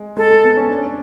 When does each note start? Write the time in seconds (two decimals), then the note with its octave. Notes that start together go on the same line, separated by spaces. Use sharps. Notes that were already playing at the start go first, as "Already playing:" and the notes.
Already playing: G#3
0.17 G#3 A4
0.30 A3
0.44 B3
0.57 C#4
0.70 D4
0.78 C#4
0.86 D4